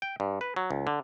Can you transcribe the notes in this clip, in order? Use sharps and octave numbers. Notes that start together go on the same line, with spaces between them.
G5
G2
B4
F#3
C#2
D3